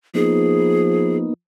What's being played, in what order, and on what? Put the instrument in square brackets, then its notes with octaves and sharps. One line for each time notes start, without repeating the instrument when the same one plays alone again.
[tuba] F3 [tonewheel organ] A#3 B3 D#4 [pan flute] G#4